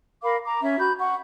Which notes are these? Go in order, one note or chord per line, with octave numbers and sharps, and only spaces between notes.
A#4 F5 B5 D6
A#5 D6
C#4 E5
F#4 B5 G6
F#5 C#6